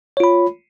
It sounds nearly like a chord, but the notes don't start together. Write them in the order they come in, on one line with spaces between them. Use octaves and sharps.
C#5 F4 B5